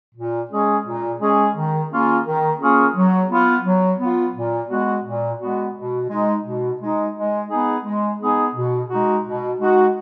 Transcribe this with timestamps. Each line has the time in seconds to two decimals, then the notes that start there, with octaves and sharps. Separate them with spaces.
0.15 A#2
0.49 G#3 C#4 G#4
0.85 A#2
1.20 G#3 C#4 G#4
1.55 D#3
1.90 A#3 C#4 F4 G#4
2.25 D#3
2.59 A#3 C#4 F4 G#4
2.95 F#3
3.29 B3 F4
3.65 F#3
3.99 B3 F4
4.34 A#2
4.69 G#3 B3 F#4
5.05 A#2
5.39 G#3 B3 F#4
5.75 B2
6.09 G#3 D#4
6.44 B2
6.80 G#3 D#4
7.14 G#3
7.49 B3 D#4 G#4
7.84 G#3
8.19 B3 D#4 G#4
8.54 B2
8.89 G#3 D#4 F#4
9.23 B2
9.59 G#3 D#4 F#4